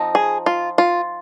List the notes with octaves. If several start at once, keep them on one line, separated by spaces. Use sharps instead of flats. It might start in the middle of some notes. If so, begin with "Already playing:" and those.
Already playing: F3 C4 D#4
G#4
F4
F4